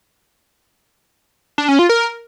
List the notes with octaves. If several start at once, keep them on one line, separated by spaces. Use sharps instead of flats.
D4
C#4
F4
A#4